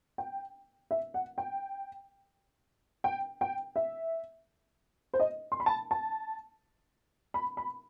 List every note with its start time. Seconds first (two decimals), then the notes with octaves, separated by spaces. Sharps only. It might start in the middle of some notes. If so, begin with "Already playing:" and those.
0.18 G5
0.91 E5
1.14 F#5
1.38 G5
3.04 G5
3.41 G5
3.76 E5
5.14 C5
5.20 D#5
5.52 C6
5.60 B5
5.66 A5
5.91 A5
7.34 B5
7.57 B5